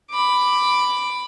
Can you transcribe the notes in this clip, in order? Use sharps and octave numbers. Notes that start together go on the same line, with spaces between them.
B5 D6